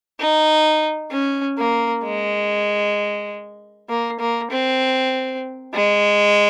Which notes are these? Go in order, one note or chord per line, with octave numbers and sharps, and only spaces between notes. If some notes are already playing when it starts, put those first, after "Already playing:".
D#4
C#4
A#3
G#3
A#3
A#3
C4
G#3